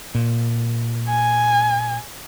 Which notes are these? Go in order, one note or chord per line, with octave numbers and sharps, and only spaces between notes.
A#2
G#5